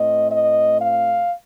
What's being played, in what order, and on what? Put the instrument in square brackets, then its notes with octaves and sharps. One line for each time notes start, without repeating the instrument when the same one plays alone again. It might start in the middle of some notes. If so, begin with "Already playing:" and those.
Already playing: [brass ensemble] A2 A3 C4 D#5
D#5
F5